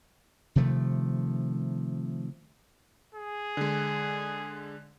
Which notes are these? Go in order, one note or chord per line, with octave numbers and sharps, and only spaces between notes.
C3 D#3 F3 A3
G#4
D3 G#3